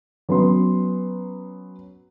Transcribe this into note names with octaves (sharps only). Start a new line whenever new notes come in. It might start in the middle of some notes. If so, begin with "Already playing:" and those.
F#3 B3 C#4 C6